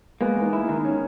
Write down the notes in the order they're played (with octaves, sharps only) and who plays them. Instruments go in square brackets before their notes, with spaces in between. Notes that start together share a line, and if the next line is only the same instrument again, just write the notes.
[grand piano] G#3 B3 [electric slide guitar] A#3
[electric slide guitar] E2
[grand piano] B3 D#4
[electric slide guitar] E4
[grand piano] A#3
[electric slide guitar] D#3
C#4